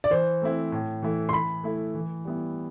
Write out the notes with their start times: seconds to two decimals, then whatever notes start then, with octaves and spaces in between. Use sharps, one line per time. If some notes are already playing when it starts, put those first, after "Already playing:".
0.04 D5
0.10 E3 C5
0.41 A3 C4 E4
0.72 A2
1.02 E3 A3 E4
1.29 C6
1.33 E3 B5
1.64 A3 E4
1.95 E3
2.25 G3 B3 E4